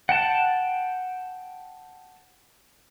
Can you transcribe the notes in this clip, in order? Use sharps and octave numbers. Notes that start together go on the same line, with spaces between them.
F#5 G5 A5